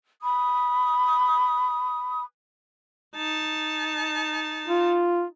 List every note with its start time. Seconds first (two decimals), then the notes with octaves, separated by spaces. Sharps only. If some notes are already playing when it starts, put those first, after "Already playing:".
0.22 B5 D#6
3.16 D#4 A5
4.68 F4